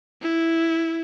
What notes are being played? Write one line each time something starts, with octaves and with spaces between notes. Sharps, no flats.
E4